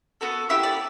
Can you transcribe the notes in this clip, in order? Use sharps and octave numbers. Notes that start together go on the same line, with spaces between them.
B3 F#4 A4
B3 E4 G4 E5
D5